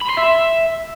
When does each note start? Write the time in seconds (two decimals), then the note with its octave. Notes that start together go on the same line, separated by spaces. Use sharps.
0.02 B5
0.09 C6
0.17 E5